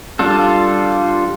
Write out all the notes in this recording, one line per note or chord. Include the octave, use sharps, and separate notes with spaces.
G3 D4 F4 A4